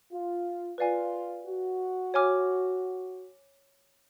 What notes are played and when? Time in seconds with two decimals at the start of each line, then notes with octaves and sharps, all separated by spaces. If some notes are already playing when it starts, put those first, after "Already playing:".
0.11 F4
0.78 F4 B4 D5 F5 G#5
1.46 F#4
2.14 C#5 G#5 D6 F6